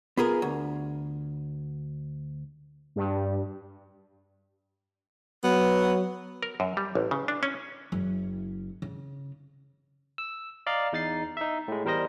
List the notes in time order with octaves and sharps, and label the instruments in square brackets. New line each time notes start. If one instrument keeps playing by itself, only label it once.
[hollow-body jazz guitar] B3 F4 G#4 A#4
D2
[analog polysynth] G2
[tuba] F#3 [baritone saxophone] B3
[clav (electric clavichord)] A#4
F#2
G3
A1
C#3
D4
C#4
[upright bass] F#1
C#3
[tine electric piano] E6
D5 D#5 F5 A#5
E2 D#4 A6 C7
D#4 E5
A2 G#3
E2 G3 A#4 C5 D#5 A#6